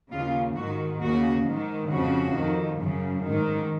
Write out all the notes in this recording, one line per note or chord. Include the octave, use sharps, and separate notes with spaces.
D#2 C#3 F4
G#2 D#3 F#4
D#2 C#3 F#4
G#2 D#3
F2 C#3 F#4
F2 D#3
F#2 C#3
G#2 D#3